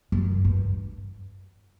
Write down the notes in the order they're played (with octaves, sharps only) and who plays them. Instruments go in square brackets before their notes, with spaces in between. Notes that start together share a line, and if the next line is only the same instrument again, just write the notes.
[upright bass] F#2
G2